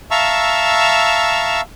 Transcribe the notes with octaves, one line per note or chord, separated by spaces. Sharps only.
E5 F5 A5 A#5 C#6 E6